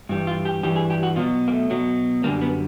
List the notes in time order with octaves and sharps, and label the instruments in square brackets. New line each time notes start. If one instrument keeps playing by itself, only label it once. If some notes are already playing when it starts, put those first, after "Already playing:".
[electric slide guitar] G2 E3 G3
F4
G4
G2 E3 G3 G4
G#4
G4
F#4
B2 F#3 F4
A#3
A3
B2 F#3
F#2 D3 G3 A#3
B3